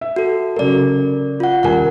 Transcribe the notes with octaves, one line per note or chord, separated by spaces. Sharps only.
E5
F#4 A4
C#3 F#3 A4 A#4 D5
F4 F#5
D#1 G3 A#4 F#5 G#5